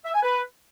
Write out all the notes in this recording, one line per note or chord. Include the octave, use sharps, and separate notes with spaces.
E5
G#5
B4